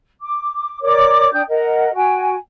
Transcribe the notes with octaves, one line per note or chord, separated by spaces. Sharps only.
D6
A#4 C#5 D5 D6
D4 G5 D#6 G6
A#4 D#5 F#5
F#4 G5 G#5